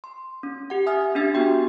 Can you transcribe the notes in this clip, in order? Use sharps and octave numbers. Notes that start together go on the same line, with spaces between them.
C6
C#4
G4 F#5
E5 G#5 D#6 F6
C#4 D4 G4 E5 A6
B3 F#4 G5 C6